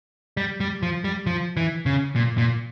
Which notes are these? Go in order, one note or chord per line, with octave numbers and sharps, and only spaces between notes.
G3
G3
F3
G3
F3
E3
C#3
A#2
A#2